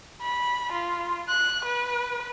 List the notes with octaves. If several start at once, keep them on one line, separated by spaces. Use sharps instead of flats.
B5
F4
F#6
B4